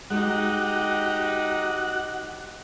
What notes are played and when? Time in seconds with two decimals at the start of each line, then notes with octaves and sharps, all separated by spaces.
0.10 G#3 D#4 F#4 G4 F#5